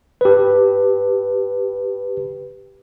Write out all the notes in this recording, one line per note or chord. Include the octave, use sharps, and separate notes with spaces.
G4 B4